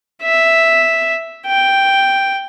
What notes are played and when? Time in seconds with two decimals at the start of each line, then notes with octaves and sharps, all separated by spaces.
0.23 E5
1.47 G5